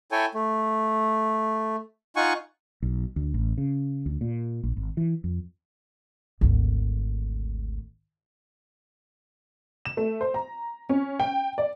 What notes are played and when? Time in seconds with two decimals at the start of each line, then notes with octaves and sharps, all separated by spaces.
0.12 E4 A4 C#5 G5 G#5
0.34 A3
2.16 D#4 F4 F#5 G#5 C#6
2.82 B1
3.16 D2
3.34 A1
3.58 C#3
4.06 D2
4.21 A#2
4.63 A#1
4.77 G#1
4.97 E3
5.24 F2
6.41 G#1 D2
9.85 E7
9.97 A3
10.21 C5
10.34 A#5
10.89 C#4
11.20 G5
11.58 D5